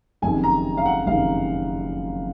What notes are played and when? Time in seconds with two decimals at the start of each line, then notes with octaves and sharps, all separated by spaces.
0.22 F#1 F2 C3 D#3 G#5
0.44 A#5
0.77 F5
0.86 F#5
1.06 F#1 F2 C3 D#3 F5